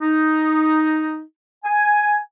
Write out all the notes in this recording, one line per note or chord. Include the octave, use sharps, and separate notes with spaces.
D#4
G#5